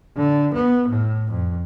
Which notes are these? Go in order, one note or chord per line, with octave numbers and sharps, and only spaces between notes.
D3
B3
A2
F2